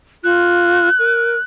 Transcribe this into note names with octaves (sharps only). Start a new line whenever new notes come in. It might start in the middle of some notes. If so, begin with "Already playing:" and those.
F4 F#6
A#4